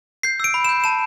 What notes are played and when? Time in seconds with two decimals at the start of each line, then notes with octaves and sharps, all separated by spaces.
0.23 G6 C7
0.40 E6 D7
0.54 B5
0.65 E7
0.69 G6
0.84 A5 E7